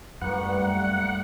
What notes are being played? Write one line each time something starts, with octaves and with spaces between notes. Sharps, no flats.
F#2 A2 G3 A#3 B4 F#5